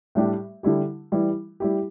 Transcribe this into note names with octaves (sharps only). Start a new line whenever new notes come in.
A2 G3 D4 G4
D3 G3 E4 G4
E3 G3 E4
G3 E4 G4